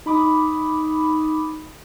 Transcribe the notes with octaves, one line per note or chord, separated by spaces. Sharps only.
D#4 B5 D6 D#6